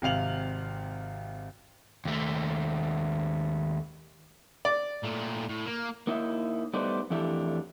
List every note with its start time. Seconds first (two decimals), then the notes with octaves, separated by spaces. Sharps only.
0.02 G#1 C3 F5 F7 F#7
2.05 D#2 A3
4.65 D5
5.03 A#2 A3
5.49 A2
5.66 A#3
6.07 A#3 D#4 E4 E5
6.73 G3 A3 B3 D#4 C5 D5
7.10 F2 E3 A3 D4 E4 G4